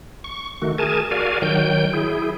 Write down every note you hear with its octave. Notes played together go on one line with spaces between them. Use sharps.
C#6
D#3 A3 F#4
G#4 A#4 G#5 A5
F#4 A#4 D5 F5 G#5
D#3 F#3 G5 G6
E4 G#4